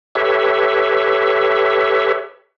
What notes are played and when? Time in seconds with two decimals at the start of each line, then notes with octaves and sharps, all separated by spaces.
0.15 G4 A4 B4 C#5 E5